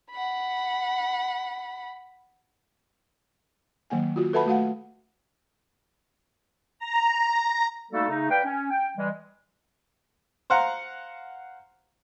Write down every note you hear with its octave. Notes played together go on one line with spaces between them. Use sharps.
F#5 B5
D#3 F#3 A#3 F#5 G#5
F4 F#4
A4 B4 E5 F#5 A5 B5
A3 F#4 F5 F#5
A#5
G3 A3 A#3 D#4 F#4 A4
C#3 A3 D#4
B4 D5 F5 G5
C#4
G5
E3 G3 G#3
C5 F5 F#5 A#5